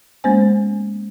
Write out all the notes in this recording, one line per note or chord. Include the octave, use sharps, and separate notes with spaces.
G#3 A#3 B3 C#4 C5 G#5